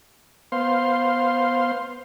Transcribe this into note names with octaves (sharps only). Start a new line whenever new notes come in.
B3 C5 F5 C6